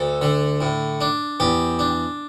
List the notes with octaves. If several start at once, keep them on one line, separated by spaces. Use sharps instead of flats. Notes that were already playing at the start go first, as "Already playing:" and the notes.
Already playing: D2 A4
D3
A2
D4
E2 G4
D4